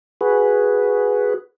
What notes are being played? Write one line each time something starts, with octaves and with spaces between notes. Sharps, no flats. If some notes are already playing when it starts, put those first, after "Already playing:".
F#4 G#4 B4